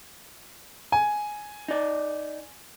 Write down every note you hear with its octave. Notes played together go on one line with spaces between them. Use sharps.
G#5
D#4 D5